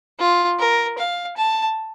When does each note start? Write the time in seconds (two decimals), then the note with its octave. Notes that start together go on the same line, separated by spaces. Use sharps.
0.19 F4
0.59 A#4
0.98 F5
1.37 A5